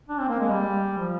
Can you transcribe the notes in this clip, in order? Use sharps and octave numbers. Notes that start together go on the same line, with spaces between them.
D4
C4
A#3
G#3
G3
F3